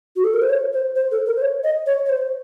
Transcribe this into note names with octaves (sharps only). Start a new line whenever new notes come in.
F#4
A4
A#4
C5
C#5
C5
C5
A4
A#4
C5
C#5
D#5
C#5
C#5
C5